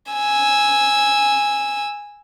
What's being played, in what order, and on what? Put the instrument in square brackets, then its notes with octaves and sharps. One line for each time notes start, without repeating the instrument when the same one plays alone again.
[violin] G#5 E6